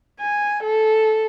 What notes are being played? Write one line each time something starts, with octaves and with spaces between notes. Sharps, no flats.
G#5
A4